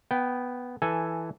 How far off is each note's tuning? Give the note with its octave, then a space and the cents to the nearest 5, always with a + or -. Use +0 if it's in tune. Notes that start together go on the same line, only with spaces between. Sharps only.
B3 +0 G5 -15
E3 +0 A4 +0 G#5 +0